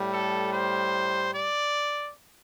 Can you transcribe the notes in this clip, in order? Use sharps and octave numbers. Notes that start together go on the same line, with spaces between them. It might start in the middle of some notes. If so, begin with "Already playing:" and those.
Already playing: A2 G3
A4
C5
D5